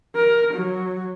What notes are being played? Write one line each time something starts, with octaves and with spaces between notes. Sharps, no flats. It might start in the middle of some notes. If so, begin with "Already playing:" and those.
A#4
F#3